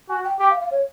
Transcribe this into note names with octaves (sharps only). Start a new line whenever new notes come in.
F#4 G#5
G5
G4 G5
F5
F5
C#5